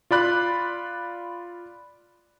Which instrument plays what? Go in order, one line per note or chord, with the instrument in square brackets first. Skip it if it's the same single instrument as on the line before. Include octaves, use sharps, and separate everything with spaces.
[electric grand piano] F4 D5 B5 F#6